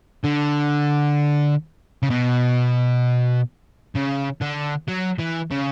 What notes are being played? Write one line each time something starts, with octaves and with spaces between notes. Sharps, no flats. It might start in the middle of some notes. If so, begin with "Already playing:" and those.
D3
C#3
B2
C#3
D3
F#3
E3
C#3